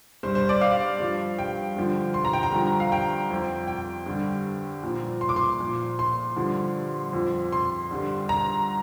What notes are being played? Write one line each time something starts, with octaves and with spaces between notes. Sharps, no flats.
G2 G3 C5
C5
D5
F5
G2 F3
G5
G2 D3 F3
C6
A#5
G5
A#5
G2 D3 F3
F5
G5
F2 F3
G5
G2 D3 G3
A#2 F3
C6
D6
C6
A#2 F3
C6
G2 D3 F3
F2 F3
C6
G2 D3 G3
A#5